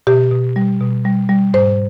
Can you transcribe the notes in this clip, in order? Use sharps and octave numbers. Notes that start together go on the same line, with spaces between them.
B2 G4
B2
G3
B2
G3
G3
G#2 C5